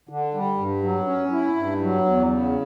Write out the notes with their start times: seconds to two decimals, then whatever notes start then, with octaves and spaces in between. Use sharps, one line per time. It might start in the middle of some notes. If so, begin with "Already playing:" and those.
0.09 D3
0.34 G3
0.58 G2
0.83 F#3
1.07 C#4
1.32 E4
1.57 G2
1.81 F#3
2.06 E2
2.31 C#3